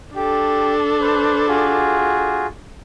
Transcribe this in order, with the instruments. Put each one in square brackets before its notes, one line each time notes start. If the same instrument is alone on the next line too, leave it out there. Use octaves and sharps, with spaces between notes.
[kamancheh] D4 A4 [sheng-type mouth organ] G4
[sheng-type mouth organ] B4 C5
F4 F#4 G#4